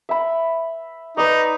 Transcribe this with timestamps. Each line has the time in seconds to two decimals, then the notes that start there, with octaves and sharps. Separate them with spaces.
0.09 E5 B5
1.17 D#4 B4 D5